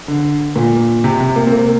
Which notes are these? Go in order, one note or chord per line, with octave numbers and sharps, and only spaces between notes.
D3
A#2
C3
C3
A#3
C4
A#3